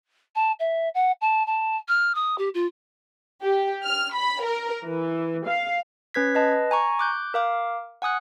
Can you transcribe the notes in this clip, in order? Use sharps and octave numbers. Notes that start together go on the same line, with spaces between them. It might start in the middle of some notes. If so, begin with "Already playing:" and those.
A5
E5
F#5
A5
A5
F6
D#6
G4
F4
G4
F6
B5
A#4
E3
F5
C#4 B4 G#6 B6
B4 D#5 A5
G#5 A#5 C#6
D6 F#6 G6
A#4 F5 D6
F#5 G#5 D#6 F#6